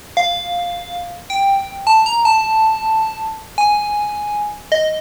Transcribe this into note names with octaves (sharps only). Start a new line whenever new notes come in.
F5
G5
A5
A#5
A5
G#5
D#5